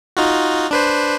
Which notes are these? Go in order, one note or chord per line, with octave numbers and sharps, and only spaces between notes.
D#4 F4 F#4
D4 B4 C5